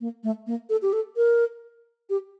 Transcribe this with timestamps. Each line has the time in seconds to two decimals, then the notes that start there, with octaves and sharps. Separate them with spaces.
0.01 A#3
0.23 A3
0.47 A#3
0.70 A4
0.82 G4
0.93 A4
1.16 A#4
2.10 G4